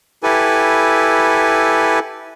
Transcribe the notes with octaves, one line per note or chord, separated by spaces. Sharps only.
E4 G4 A4 B4 G#5